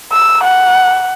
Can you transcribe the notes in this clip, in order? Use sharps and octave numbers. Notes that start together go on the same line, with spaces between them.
E6
F#5